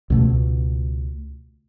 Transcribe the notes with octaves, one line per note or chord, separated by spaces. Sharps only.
C#2 B2 A3